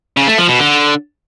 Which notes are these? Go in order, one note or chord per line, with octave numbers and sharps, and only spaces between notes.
C#3
A3
F3
B2
D3